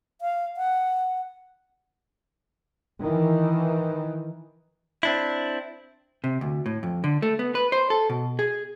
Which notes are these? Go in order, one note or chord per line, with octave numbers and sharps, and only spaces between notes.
F5
F#5
D#3 E3
C4 D4 E4
C3
D2
A2
F2
D3
A3
B3
B4
C5
A4
B2
G#4